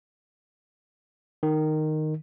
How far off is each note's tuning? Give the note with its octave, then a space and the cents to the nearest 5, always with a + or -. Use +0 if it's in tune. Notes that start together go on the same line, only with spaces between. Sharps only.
D#3 -10